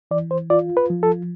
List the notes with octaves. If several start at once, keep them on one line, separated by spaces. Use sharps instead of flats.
E3 D5
C5
F4 D5
B4
F3
A4